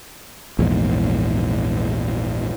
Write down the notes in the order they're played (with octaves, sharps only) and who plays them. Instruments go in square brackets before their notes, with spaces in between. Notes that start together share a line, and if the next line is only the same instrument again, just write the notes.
[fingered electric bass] A#1 E2 G#2